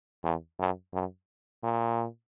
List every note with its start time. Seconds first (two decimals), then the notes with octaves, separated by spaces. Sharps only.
0.24 E2
0.59 F#2
0.94 F#2
1.63 A#2